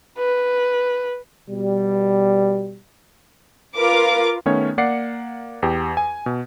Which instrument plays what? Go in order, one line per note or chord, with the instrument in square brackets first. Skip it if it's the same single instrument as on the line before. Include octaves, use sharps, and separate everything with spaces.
[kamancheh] B4
[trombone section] B2 G3
[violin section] F4 A#4 B4 D6
[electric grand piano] D#3 A3 B3 C#4 C#5
A#3 D5 F#5 C7 C#7
E2 G4
G#5
B2